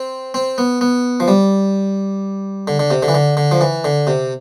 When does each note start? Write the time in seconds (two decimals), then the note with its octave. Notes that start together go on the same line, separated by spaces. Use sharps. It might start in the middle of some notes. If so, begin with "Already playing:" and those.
Already playing: C4
0.34 C4
0.58 B3
0.81 B3
1.20 F3
1.28 G3
2.68 D3
2.79 D3
2.91 C3
3.03 D3
3.08 E3
3.14 D3
3.37 D3
3.51 F3
3.61 E3
3.85 D3
4.07 C3